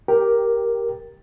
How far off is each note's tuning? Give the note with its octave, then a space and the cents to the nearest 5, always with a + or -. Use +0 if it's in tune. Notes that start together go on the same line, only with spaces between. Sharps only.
G4 +0 A#4 +5 G5 +0